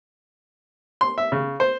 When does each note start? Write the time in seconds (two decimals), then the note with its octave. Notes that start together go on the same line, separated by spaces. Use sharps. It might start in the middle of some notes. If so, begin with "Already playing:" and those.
1.01 C6
1.18 E5
1.32 C#3
1.60 C5